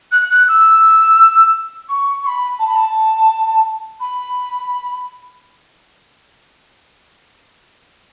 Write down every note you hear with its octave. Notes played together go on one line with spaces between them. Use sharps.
F#6
F#6
E6
C#6
C#6
B5
A5
B5
A5
B5